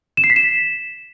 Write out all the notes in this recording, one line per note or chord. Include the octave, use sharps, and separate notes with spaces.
E7
C7
B6
E7